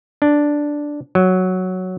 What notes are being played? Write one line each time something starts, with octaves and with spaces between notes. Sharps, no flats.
D4
F#3